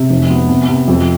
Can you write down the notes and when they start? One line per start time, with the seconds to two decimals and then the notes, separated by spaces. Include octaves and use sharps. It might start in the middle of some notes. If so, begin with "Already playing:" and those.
Already playing: C3
0.10 F1
0.30 B3
0.49 C3
0.69 C3
0.88 F2